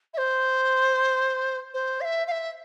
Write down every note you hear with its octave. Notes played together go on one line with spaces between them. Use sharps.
E5
C5
C5
F5
E5
F5
E5